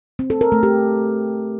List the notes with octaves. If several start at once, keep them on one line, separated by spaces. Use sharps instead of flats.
C4
A4
A#4
A3
G4